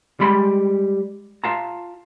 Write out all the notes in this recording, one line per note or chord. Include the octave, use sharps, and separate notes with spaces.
G3 G#3 B5 C6
F4 F5 A5 A#5